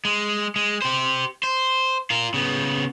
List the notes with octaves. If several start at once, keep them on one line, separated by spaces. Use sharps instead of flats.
G#3
G#3
G4 C5
C5
F4 A#4
C#3 B3